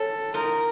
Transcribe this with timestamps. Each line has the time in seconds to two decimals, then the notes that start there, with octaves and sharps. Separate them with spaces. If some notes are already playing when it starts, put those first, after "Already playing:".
Already playing: C#4 A4
0.34 D#4 F4 A#4